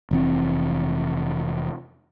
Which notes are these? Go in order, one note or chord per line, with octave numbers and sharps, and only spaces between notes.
F1 E3 C4